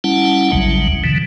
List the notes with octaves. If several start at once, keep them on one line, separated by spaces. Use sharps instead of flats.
G3 C#4 E4 F#5 A5
A1 D#2 C#3 F#3 G3
B2 D3 E3